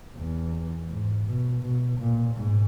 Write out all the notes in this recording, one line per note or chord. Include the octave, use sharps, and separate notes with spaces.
E2
G#2
B2
B2
A#2
G#2